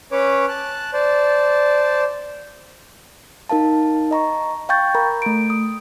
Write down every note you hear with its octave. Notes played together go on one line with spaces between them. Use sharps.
C#4 B4 C#5 D6
A5 F#6
C5 D5 A5
D#4 A#4 F5 A5
D#5 A#5 C#6
F5 G5 C#6 G6 A6
A#4 A#5 B5
A3 D7
D#6